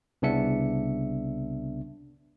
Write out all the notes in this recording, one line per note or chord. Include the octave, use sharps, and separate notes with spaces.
C2 C#3 B3 D4 E5 C#7